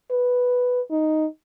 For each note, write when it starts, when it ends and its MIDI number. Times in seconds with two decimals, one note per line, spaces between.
0.11 0.81 71
0.91 1.26 63